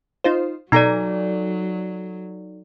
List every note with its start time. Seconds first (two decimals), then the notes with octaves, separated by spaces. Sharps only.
0.24 D#4 F4 C5
0.72 B2 F#3 D#4 A4 D5 A#5